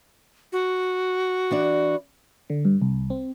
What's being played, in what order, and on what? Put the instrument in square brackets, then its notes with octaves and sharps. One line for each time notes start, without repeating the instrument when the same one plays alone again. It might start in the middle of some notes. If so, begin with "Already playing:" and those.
[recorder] F#4
[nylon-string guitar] E3 D4 D5
[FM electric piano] D3
G2
C2
C4